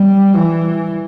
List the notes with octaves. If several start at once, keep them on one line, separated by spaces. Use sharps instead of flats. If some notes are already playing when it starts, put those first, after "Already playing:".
Already playing: G3
E3